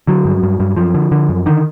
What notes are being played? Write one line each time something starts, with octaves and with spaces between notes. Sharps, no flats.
D3 F#3
G2
G2
G2
F#2 F3
D3
D3
F#2
D3 D#3